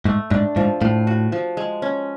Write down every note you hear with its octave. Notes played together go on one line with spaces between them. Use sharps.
G#2 A3
G#2 D4
G#2 F3
A2 F3
F#4
F3
G#3
C#4